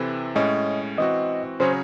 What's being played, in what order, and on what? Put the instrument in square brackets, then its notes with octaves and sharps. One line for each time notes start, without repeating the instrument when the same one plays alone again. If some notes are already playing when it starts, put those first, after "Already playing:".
Already playing: [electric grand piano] C3 E3 C4 E4 A4
[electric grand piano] A2 G#3 C#4 [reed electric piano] D#5
[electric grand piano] E3 C4 F#4 [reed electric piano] D#5
[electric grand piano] C#3 F#3 C#4 G#4 C#5 [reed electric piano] C5